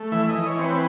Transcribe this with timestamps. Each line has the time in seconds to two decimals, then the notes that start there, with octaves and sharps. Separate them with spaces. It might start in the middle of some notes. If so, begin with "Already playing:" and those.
Already playing: A3
0.12 E3 E5
0.29 D#5
0.35 E3
0.46 C#5
0.58 C4
0.64 B4